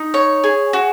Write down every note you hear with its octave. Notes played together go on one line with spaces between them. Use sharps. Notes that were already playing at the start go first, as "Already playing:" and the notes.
Already playing: D#4
C#5
G#4
F#4